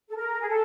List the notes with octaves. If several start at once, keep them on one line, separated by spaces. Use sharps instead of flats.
A4
A#4
G#4
A4